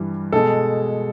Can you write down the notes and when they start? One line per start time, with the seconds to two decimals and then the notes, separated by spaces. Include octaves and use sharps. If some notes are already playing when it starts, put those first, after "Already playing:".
Already playing: G2 E3 G3
0.32 B2 G#3 A4